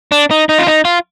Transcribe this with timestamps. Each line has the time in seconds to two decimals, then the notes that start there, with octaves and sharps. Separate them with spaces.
0.12 D4
0.31 D#4
0.49 D#4
0.59 F4
0.67 D#4
0.85 F4